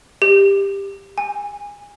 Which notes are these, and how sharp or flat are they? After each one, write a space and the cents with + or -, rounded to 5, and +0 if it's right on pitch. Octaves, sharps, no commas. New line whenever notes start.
G4 +15
G#5 -20